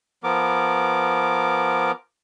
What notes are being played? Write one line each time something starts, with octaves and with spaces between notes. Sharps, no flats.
F3 B3 A#4 D6